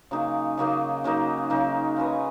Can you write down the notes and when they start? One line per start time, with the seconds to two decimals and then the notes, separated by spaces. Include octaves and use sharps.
0.11 C#3 F#3 A#3 D#4
0.57 C#3 F#3 A#3 D#4
1.04 C#3 F#3 A#3 D#4
1.50 C#3 F#3 A#3 D#4
1.96 G#3 C#4 F#4 B4